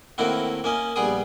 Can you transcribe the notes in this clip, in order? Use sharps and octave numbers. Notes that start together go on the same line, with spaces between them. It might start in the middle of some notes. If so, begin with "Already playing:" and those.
A2 D#3 A#3 C4 E4 F#4
A#3 C#4 D#5
A#1 G3 B3 G#4 D#6